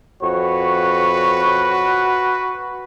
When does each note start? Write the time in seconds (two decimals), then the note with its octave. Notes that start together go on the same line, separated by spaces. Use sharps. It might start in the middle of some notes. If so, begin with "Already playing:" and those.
0.23 F2 F#4 B4 C#5